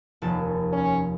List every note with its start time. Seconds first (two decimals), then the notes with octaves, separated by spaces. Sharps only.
0.22 F1 D#2 A5
0.73 C#4